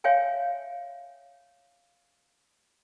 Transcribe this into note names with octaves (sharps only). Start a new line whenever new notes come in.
C#5 E5 F5 G5 G#5